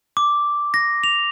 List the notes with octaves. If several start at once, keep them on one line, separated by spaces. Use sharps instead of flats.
D6
A#6
F7